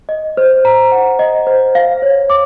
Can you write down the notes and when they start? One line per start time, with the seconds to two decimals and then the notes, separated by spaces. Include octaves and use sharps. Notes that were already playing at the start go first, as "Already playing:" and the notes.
0.09 D#5
0.37 C5
0.65 A#5
0.92 F#5
1.19 D#5
1.47 C5
1.75 F5
2.02 C#5
2.30 D6